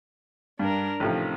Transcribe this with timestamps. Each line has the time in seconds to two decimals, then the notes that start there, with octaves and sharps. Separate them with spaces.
0.59 G2 D4 A#4
1.00 A1 C3 D#3 F3 C4